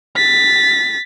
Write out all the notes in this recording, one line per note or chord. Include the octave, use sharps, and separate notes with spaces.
A6 B6